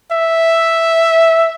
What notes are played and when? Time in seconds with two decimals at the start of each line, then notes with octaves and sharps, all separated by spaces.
0.12 E5